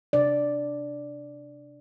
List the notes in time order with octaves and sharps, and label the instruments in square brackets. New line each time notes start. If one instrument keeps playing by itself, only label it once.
[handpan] C3 D4 D5